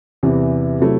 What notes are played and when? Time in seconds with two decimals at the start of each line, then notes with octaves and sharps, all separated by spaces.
0.23 E2 C3 E3
0.80 C3 F#3 A3 E4